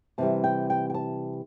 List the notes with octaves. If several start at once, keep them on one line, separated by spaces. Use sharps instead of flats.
C3 E3 G3 A5
G5
G5
G5
A5